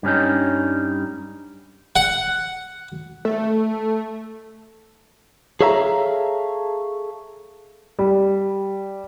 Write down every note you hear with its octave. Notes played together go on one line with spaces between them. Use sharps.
G2 G3 C#4 D#4
F#5
A3
G#4 A4 C#5 E5 F5 A#5
G3